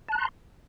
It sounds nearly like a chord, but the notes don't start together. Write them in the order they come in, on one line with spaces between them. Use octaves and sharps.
A5 F#6 A#5 C6